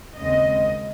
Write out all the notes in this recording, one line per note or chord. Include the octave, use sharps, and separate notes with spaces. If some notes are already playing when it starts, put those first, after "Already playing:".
D#2 C#3 G#3 C4 D#5